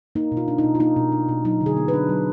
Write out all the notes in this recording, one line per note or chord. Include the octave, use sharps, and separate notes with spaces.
A#3 D#4
B2
F4
D4
D#4
B2
F4
A#3 D#4
B2
D4
B2
F#3 D#4
D3
G#4
B3
B4
D4
F#3